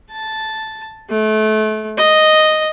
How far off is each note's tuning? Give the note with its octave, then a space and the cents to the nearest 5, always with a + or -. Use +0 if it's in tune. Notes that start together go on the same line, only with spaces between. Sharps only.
A5 -5
A3 -30
D#5 -5